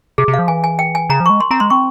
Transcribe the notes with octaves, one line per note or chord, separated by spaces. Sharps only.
C3 G#4
C3
F5
F3
E3 G#5
G#5
G5
G#5
C#3 A#5
F3
G#3 C#6
C6
C4 A#5
G#3 C6
C4 C#6